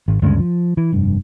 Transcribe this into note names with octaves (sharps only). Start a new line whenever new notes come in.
G#1
D2 G2 C#3 G#3
F3
E3
F1 G2